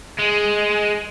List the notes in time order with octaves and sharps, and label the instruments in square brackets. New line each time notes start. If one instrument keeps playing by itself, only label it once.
[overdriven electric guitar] G#3